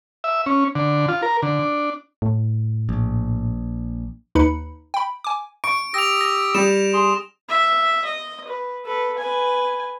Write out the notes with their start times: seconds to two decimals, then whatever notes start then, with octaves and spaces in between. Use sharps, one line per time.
0.24 E5
0.46 C#4
0.75 D3
1.09 F4
1.22 A#4
1.42 D3
1.59 D4
2.22 A2
2.89 A#1
4.35 D#2 D#4 B4 B5 C#7
4.94 G5 B5
5.24 G#5 D6
5.64 C#6 D7
5.94 G4 D#6 E6 A#6 F7
6.21 A#6
6.55 G3 E7
6.93 G#4 C6
7.49 E5
8.05 D#5
8.48 B4
8.85 A4 B4
9.18 B4 G#5